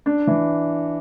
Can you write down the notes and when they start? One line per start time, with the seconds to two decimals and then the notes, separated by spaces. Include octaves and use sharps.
0.06 D4
0.27 E3